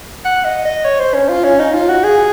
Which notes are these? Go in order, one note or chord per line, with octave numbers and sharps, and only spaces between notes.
F#5
D#5
D#5
C#5
C5
C#4
F4
C#4
D#4
F4
F#4
G#4